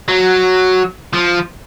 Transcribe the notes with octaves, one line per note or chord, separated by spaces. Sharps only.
F#3
F3